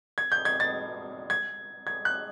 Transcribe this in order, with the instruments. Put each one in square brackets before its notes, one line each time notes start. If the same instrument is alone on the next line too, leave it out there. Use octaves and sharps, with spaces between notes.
[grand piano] G#6
G6
G#6
A6
G#6
G#6
F#6